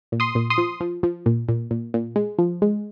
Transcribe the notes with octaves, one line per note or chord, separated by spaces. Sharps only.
A#2
C6 D#6
A#2
C6 D#6
F3
F3
F3
A#2
A#2
A#2
A#2
G#3
F3
G#3